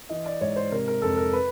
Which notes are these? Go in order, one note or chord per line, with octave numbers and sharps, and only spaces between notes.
E3 D#5
D5
G#2 C#5
C5
C3 A#4
A#4
F2 A4
A#4
B4